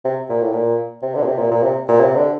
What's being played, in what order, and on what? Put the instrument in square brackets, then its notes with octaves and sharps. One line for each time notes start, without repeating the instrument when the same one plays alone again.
[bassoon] C3
A#2
A2
A#2
C3
D3
A#2
C3
A#2
A#2
C3
A#2
C3
D3